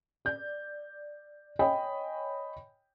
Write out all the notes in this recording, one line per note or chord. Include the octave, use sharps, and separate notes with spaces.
D5 G6
C#5 D#5 G5 G#5 B5